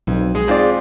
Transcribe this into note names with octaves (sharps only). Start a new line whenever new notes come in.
B1 F2
G#3 G#4
G#2 C4 F4 G#4 D5